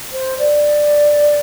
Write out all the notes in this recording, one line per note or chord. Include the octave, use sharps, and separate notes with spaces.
C5
D5